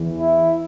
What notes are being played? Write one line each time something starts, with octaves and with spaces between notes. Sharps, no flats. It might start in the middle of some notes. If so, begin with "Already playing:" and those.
Already playing: E2 E3
E4